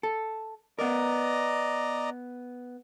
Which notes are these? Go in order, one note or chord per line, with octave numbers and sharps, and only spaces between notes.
A4
B3 A#4 D5 D#5 A#5